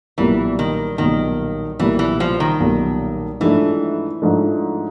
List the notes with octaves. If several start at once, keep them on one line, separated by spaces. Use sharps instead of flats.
B1 A#2 E3 G3 A#3
D#3
B1 A#2 D#3 G3 A#3
B1 A#2 E3 G3 A#3
E3
F3
D#3
B1 A#2 G3 A#3
G#2 E3 F3 A3 D4
G#2 F3 A3 D4